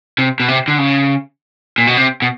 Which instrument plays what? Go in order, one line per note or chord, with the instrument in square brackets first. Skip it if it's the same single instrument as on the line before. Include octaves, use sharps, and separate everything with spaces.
[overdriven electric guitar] C3
B2
C3
D3
C#3
A#2
B2
C3
B2